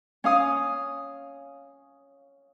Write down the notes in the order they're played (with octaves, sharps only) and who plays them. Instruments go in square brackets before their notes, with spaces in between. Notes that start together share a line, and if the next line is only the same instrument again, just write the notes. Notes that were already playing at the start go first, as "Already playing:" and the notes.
[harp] C#4 F5 D#6